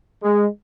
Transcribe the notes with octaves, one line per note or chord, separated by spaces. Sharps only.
G#3